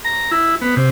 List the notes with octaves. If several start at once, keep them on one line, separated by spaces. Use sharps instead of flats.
A#5
E4
B3
C3